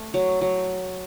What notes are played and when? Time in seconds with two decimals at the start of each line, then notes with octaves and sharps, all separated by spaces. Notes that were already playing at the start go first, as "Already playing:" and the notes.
Already playing: A3
0.14 F#3
0.41 F#3